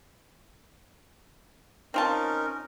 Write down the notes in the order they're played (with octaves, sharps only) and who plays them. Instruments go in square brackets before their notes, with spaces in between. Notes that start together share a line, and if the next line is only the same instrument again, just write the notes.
[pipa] C4 F4 A5 [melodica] C#4 D#4 A#4